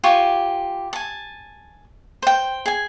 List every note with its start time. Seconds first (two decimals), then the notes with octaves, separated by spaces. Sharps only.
0.04 F4 G4 G#5 C#6
0.93 G#5 A5
2.22 C5 G5
2.66 G#4 G#5